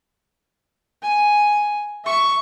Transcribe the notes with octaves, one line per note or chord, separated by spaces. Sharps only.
G#5
E5 C#6